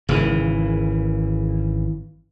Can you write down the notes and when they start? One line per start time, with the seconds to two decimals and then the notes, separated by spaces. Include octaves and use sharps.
0.09 G#1 C#3 E3